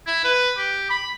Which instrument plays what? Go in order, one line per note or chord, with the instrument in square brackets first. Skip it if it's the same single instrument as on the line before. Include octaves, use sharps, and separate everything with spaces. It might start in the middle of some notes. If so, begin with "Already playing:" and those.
[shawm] E4
B4
G4
B5